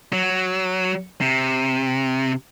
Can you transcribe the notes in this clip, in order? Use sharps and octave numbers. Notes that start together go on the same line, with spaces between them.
F#3
C3